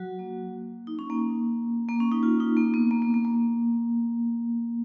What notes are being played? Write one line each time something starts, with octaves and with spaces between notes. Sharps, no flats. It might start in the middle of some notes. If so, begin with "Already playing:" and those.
Already playing: F#3 F#4
A#3
D#4
C#4
A#3
A#3
C#4
D#4
F4
D#4
A#3
B3
A#3
A#3
A#3
A#3